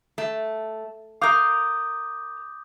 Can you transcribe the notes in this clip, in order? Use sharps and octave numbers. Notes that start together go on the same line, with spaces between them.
A3
A#4 F5 D6 D#6 G6